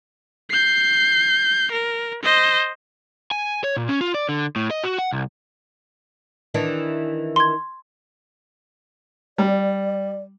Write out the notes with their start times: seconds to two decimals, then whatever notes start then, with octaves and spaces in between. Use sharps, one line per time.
0.50 G6 C7
1.71 A#4
2.23 C5 D#5
3.31 G#5
3.64 C#5
3.77 A#2
3.89 C#4
4.01 F4
4.14 D5
4.29 D3
4.56 A2
4.71 D#5
4.84 F#4
4.99 F#5
5.12 C2
6.54 D#3 E3 D4
7.36 C6 G#6
9.38 G3 D5